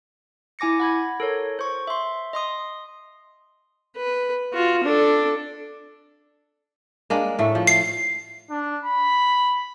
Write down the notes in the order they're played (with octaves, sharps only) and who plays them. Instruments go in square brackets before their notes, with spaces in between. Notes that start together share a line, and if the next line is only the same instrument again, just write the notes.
[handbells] E4 G#5 D6 A#6 C#7
F#5 B5 G#6
A4 A#4 C#5
C5 C#6
E5 C6
D#5 C6 D#6
[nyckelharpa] B4
F4 F#4
D4 A4
[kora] G#3 A#3 D4
A2 A3
F3
[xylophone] C7
[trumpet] D4
B5